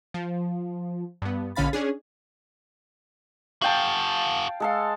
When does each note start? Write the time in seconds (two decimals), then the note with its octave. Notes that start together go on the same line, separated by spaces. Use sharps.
0.14 F3
1.22 G2 B3
1.56 A#1 D3 C#4 F5 B5 A6
1.73 C#4 D4 G#4
3.62 F#4 G#4 F5 G5 A5
4.60 G#3 A4 F5